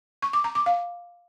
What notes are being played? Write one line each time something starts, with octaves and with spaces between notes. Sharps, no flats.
C#6
D6
A#5
D6
F5